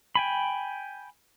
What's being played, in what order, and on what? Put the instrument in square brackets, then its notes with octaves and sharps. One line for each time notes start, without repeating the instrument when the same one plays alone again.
[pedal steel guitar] G5 G#5 B5